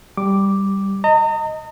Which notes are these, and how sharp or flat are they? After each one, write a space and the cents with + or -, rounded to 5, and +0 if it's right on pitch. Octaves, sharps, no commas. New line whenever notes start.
G3 +0 D6 +0
D#5 +0 A#5 -40